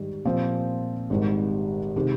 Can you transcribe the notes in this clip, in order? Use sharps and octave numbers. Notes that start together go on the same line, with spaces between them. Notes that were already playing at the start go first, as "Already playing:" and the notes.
Already playing: G#2 D#3 G3
A#2 F3 C4
G#1 G#2 D#3 G3
C3 D#3 G#3